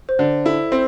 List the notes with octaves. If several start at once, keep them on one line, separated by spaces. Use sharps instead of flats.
C5
D3 D5
E4 A4
C4 C5